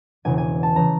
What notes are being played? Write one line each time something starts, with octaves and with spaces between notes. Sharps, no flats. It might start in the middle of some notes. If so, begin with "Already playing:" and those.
E1 E2 C#3 E3 G#5
G#5
A5
C#3 E3 A#5